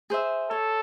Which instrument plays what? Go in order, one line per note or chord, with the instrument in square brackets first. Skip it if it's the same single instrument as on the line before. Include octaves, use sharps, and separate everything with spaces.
[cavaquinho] G#4 C5 E5
[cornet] A4 [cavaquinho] C#5